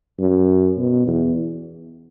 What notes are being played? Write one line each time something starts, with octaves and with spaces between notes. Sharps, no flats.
F#2
B2
E2